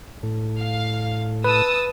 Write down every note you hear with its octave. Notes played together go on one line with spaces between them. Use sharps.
A2
F5
B4 A5 D#6 E6